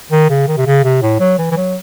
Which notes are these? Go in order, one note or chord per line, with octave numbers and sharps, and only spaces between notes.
D#3
C#3
D#3
C3
C#3
C3
A2
F#3
E3
E3
F#3